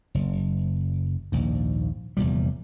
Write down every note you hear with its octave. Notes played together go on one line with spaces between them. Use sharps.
F#1
A#1 D#2 G#2
F1 E2 A#2 G3